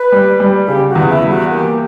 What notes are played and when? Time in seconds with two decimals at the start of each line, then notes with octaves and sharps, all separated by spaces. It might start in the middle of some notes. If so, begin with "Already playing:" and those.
Already playing: B4
0.12 G3
0.40 G3
0.67 C#3 G4
0.89 F#4
0.95 E2
1.09 E4
1.23 G3
1.30 F#4
1.51 A#3 G4